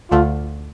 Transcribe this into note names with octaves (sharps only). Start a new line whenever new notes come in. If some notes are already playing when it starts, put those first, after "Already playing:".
D2 D3 A3 F4